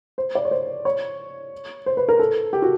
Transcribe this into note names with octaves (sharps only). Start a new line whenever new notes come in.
C5
D5
C#5
C5
C#5
C5
B4
A#4
A4
G4
F#4